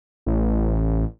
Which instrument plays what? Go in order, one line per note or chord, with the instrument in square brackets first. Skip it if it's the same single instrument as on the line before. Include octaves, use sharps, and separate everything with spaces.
[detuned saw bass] A1